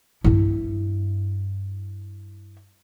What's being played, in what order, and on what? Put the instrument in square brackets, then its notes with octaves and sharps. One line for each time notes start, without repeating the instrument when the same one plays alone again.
[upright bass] G2 E4